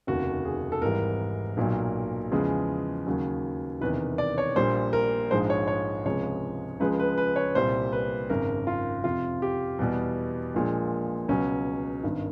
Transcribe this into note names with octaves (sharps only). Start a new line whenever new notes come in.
F1 D#2 C#3 F#4
G#4
A4
G#1 G#2 E3 G3 A#4
B1 A#2 F#3
E2 C#3 F3 G#3
D#2 C#3 F#3
E1 E2 C3 D#3 B4
D5
C#5
A#1 A#2 G3 C5
A#4
A#1 G#2 F3 G#3 C5
C#5
C#5
C#2 C3 F3 G#3 C#5
C#2 C#3 F3 G#3 B4
B4
B4
C#5
C2 A#2 G3 C5
B4
G#1 F#2 C#3 A#4
F4
F2 C3 F3 F4
G4
E2 B2 G3
A#1 A#2 F3 G#3
C#2 B2 F#3 C#4
G#1 G2 D#3